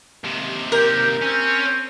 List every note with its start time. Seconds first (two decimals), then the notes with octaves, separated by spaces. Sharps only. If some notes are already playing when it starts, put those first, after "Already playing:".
0.24 D#2 C3
0.72 G4 A#4 G5
1.22 C4 C#4